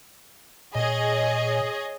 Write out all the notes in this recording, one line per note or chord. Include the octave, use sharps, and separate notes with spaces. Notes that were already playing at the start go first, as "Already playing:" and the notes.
A#2 G#4 C#5 D#5